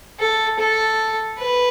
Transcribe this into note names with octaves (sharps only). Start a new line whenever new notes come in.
A4
A4
B4